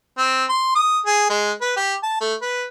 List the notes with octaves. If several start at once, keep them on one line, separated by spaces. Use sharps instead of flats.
C4
C6
D#6
G#4
G#3
B4
G4
A5
A3
B4